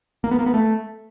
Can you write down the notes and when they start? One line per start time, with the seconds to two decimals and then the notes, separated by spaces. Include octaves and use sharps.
0.24 A#3
0.31 B3
0.39 A#3
0.46 B3
0.54 A3